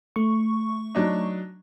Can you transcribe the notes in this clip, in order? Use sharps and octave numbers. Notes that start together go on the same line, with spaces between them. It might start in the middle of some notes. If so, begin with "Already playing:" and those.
A3 C#6
F#3 D4 D#4